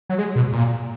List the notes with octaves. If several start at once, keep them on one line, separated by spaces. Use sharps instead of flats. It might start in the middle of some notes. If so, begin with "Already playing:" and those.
F#3
G#3
B2
A#2